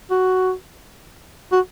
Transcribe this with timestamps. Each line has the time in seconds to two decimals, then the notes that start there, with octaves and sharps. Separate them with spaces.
0.11 F#4
1.52 F#4